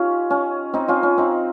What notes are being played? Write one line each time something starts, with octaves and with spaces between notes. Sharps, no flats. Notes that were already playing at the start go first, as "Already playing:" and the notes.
Already playing: C#4 D#4 F4 G4 C#5
C#4
C4 D#4
C#4 F4
C#4
C4 D#4